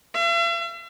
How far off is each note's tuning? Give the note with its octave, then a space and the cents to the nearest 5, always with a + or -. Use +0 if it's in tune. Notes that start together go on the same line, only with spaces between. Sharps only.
E5 +45